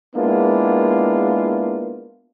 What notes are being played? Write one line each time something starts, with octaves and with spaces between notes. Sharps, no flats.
G#3 A#3 B3 D4 E4 F4